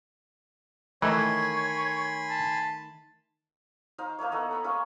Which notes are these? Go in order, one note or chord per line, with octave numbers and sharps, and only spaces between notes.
D#3 E3 A3 D#4 C#5 G#5 B5 C6
A5
D#4 C5 F5
A#3 D#4 E4 C#5
B3 A4 D#5 F#5
A#5 B5 C#6
G#3 A#3 C#4 E4